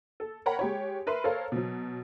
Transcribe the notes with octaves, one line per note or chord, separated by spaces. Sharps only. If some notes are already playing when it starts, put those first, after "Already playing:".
A4
A#4 C#5 F#5 G5 A#5 B5
G#3 G4 C#5
A#4 B4 E5 B5 C6
A4 A#4 C5 C#5 F5
B2 F#3